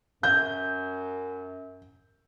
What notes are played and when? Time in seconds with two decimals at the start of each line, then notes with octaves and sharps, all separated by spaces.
0.23 F#2 G6